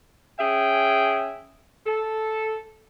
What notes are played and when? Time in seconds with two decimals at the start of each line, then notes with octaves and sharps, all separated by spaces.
0.40 C#4 G#4 E5 G5
1.86 A4